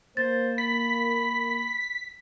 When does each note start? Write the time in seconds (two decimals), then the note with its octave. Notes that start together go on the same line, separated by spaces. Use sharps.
0.17 A#3 C5 A6
0.58 B5 B6